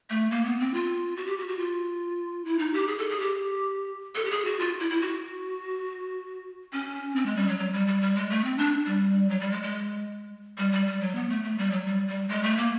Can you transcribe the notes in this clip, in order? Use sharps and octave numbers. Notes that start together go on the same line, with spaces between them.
A3
A#3
B3
C4
F4
F#4
G4
F#4
F#4
F4
E4
D#4
G4
G#4
A4
G#4
G4
A4
G4
G#4
F#4
F4
E4
E4
F#4
C#4
C4
G#3
G3
F#3
F#3
G3
G3
G3
G#3
A3
C4
D4
G3
F#3
G3
G#3
G#3
G3
G3
G3
F#3
B3
A3
A3
G3
F#3
G3
G3
G#3
A3
A#3